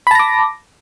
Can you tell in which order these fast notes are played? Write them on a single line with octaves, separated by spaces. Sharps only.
B5 A5 A#6 D6